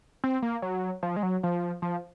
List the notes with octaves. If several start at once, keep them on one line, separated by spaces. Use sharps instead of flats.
C4
A#3
F#3
F3
G#3
F#3
F3
F3